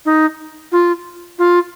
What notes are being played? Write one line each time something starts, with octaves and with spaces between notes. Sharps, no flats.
D#4
F4
F4